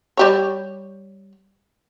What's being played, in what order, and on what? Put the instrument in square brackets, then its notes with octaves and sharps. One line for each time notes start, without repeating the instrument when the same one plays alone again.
[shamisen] G3 G4 C#5